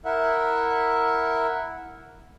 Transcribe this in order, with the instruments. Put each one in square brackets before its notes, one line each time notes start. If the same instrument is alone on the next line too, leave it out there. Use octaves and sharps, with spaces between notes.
[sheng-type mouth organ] E4 A#4 E5 F#5